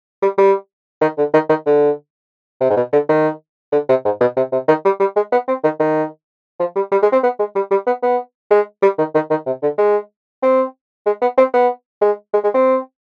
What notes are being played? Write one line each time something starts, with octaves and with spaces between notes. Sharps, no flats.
G3
G3
D#3
D3
D#3
D#3
D3
C3
G#2
B2
D3
D#3
D3
C3
G#2
B2
C3
C3
D#3
G3
G3
G#3
B3
C4
D#3
D#3
F3
G3
G3
G#3
C4
B3
G#3
G3
G3
B3
B3
G#3
G3
D#3
D#3
D#3
C3
D3
G#3
C4
G#3
B3
C4
B3
G#3
G#3
G#3
C4